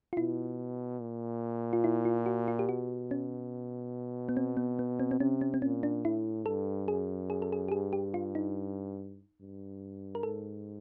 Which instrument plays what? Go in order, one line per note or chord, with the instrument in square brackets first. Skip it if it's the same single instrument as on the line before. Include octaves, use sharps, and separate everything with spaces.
[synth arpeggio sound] F4
[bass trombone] B2 [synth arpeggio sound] E4
[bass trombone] A#2
[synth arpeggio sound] F4
E4
F4
F#4
F4
G4
[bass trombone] B2 [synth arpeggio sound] F#4
[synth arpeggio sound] C#4
B3
C4
B3
B3
C4
C4
[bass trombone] C3 [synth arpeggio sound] C#4
[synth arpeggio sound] C#4
C4
[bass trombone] A#2 [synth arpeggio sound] C#4
[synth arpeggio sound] D4
[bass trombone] A2 [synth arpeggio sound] E4
[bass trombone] G2 [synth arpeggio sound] A4
[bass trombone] F#2 [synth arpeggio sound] G#4
[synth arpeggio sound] G#4
A4
G#4
G4
[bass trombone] G2 [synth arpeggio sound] G#4
[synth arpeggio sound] G4
F4
D#4
[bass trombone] G2
[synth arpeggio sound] A#4
[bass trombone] G#2 [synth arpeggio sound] A4